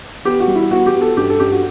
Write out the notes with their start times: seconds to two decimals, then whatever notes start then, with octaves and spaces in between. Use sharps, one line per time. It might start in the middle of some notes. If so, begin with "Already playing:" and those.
0.25 B3 G4
0.40 F#4
0.47 G3
0.55 E4
0.71 B3 F#4
0.86 G4
0.94 B3
1.01 A4
1.17 G2 G4
1.30 A4
1.40 G2 G4
1.52 F#4